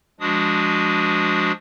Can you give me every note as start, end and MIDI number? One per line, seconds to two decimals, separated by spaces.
0.20 1.52 53
0.20 1.52 56
0.20 1.52 62
0.20 1.52 66
0.20 1.52 87